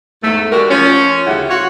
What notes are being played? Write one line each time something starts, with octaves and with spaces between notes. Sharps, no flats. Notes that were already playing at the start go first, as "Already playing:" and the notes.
E2 G#2 A3
G#3 D4 F#4 G4 A#4
F3 C#4
D2 C#3 G3 E4 F#5
F4 F#4 C#5